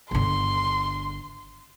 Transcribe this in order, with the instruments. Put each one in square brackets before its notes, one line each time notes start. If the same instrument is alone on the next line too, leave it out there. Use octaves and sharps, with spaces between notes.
[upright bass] G1 D3 [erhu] C6